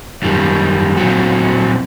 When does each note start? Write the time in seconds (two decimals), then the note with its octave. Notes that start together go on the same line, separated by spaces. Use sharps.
0.22 F#2 D#3 G3
0.97 A#2 F#3 C4 F#4